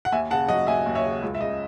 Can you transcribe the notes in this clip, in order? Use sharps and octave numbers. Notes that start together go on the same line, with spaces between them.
F#5
D#2 E5 G#5
C#3 F#5 A5
F#3 D#5 F#5
D#2 E5 G#5
D#2
C#5 E5
C#3
C#2
E5
C#3 D#5